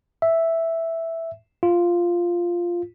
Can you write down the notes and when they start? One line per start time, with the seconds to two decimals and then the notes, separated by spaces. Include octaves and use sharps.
0.22 E5
1.63 F4